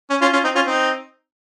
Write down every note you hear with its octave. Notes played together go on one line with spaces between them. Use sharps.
C#4
C#4 F4
C#4 F4
C4 D#4
C#4 F4
C4 D#4